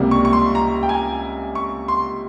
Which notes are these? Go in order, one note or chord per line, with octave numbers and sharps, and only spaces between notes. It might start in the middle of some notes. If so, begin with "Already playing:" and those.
Already playing: C#2 C3 G3 A#3
C#6
C#6
C6
A#5
G5
G#5
C#6
C6